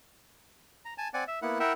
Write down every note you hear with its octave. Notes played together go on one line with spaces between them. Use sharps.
A#5
G#5 A5
C4 D5 F#5 G#5
E5
A#3 B3 E4 F#5
E4 A#4 E5 F#5 G5